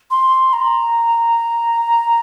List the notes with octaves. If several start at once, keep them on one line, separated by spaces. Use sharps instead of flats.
C6
A#5